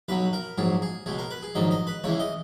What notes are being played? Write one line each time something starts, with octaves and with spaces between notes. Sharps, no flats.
B1 B2 F#3 B4
A#4
A#1 G#2 F#3 G#4
G#4
C#2 B2 G#3 G#4
A#4
B4
G#4
A#1 G#2 D#3 F#3 D#5
D#5
B4
C#2 C#3 E3 G#3 C#5
D#5